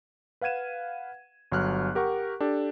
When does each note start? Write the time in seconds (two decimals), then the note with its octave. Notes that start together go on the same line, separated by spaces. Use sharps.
0.41 B4 F5 F#5 G#6 D#7 E7
1.52 G1 F#3 F6 F#6
1.95 G4 A#4 F#5 C#6
2.40 D4 G4 A4